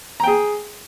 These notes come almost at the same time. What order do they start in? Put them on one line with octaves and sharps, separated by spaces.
A#5 G5 G#4